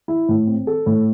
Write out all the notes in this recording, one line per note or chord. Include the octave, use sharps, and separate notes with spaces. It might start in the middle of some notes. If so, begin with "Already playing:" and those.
E4
A2
C4
A4
A2